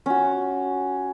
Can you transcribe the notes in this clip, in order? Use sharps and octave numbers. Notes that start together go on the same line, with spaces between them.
C#4 F#4